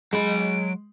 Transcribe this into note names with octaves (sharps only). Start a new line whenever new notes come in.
F#3 G#3 B5 D7